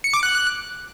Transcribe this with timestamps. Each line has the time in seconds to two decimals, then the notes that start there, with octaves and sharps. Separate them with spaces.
0.04 C#7
0.14 D6
0.23 F#6